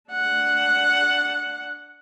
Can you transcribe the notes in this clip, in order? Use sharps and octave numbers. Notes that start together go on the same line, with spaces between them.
D4 F#5